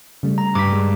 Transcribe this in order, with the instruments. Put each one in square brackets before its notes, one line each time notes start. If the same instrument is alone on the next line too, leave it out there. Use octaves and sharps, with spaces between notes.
[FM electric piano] C#3 G3 A3
[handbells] A#5
[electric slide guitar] G2 [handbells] D6 B6
[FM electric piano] G#3